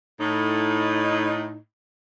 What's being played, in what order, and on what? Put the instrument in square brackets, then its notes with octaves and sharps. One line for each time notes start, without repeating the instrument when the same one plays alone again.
[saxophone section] A2 D#4